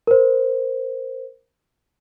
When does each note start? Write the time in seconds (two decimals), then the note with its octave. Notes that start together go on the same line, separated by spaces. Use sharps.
0.07 A#4 C5